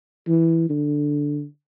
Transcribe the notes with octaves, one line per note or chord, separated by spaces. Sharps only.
E3
D3